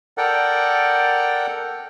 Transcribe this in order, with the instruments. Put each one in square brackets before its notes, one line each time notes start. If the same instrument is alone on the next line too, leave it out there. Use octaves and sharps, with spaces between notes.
[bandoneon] A4 A#4 D5 F#5 G5